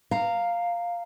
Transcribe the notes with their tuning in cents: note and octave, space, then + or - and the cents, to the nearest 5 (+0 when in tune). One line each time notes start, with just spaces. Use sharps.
F5 +0 A#5 -20